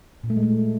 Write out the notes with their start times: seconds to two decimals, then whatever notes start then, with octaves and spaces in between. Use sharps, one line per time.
0.24 A#2
0.30 A3
0.36 G#3
0.43 A3